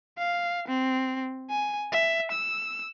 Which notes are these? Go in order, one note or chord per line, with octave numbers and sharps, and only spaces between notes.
F5
C4
G#5
E5
E6